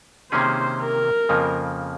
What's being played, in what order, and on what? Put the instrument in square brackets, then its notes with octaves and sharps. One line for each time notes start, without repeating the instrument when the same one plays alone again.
[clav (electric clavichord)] C3 D#3 A#3 C#4 G#4 [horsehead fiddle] C5
[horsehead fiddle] A#4
[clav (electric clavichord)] F2 C#3 F3 A#3